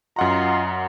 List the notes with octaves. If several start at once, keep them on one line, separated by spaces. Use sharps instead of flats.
F#2 F4 D#5 F#5 A#5 C6